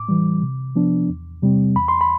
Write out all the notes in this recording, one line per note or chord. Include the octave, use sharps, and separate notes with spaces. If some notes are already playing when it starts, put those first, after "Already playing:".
Already playing: A2 D6
E3 G3
C3
F3 B3 D4
E2
C3 G3 C4
E2 B5
C6
B5